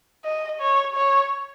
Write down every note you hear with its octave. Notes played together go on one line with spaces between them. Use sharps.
D#5
C#5
C#5